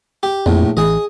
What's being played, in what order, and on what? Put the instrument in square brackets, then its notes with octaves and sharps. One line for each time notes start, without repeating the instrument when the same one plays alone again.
[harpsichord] G4
[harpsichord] A#1 A2 [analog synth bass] F2
[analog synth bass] A1 [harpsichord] G#4 D#5